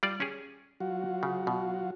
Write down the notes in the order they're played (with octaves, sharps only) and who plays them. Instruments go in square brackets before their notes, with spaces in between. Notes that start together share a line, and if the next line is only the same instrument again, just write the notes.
[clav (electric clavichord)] G3 F4 D5
C#4 G4 G#4
[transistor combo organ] F#3 F4 F#4
[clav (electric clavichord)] C#3
B2